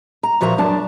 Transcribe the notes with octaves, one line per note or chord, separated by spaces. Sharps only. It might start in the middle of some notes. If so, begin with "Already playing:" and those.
A#5
A#2 F3 F#4 E5 A#5
F#2 D4 A5